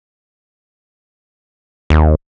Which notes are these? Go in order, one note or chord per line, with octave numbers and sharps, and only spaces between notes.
D#2